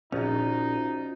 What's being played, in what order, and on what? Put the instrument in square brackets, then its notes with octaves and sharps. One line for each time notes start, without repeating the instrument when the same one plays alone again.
[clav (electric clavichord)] A#1 [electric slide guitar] C#4 F4 F#4 [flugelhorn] D#4